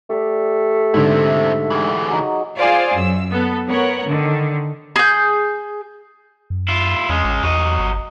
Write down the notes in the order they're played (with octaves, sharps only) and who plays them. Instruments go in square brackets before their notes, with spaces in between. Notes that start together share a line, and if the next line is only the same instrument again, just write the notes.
[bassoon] A3 [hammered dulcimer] G4 D5
[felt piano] G#2 D3 [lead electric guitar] C4 E4
[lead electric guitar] D2 E3 [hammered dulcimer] G#4 G5
[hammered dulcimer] F#3 D#4
[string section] F4 G#4 C5 D5 F5
F#2 E6
B3 A4
B3 A#4 C#5 F#5
D3 D#3
[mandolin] G#4 G6
[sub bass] F#2
[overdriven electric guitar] E4 F4
[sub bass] E2 [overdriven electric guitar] G#3 C#4
[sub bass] A1
[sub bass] E2 [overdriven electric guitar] F#3 D#5
[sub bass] G1